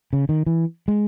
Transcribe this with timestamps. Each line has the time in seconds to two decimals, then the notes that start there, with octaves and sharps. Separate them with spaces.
0.13 C#3
0.29 D#3
0.46 E3
0.88 G#3